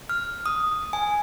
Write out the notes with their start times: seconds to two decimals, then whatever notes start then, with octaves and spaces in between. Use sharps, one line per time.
0.09 F6
0.46 D#6
0.93 G#5